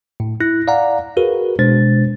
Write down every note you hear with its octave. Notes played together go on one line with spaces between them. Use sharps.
A2
E4 F#6 A#6
D5 F5 F#5 A#5
F#4 G#4 A#4 B4
B2 G#3 D4 C5 A6